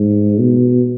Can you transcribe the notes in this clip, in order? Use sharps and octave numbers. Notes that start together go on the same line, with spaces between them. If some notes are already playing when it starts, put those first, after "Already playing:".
Already playing: G#2
B2